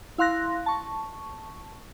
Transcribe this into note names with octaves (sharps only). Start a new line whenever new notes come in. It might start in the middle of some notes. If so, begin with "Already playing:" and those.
E4 F5 C6 F#6 A#6
A5 C#6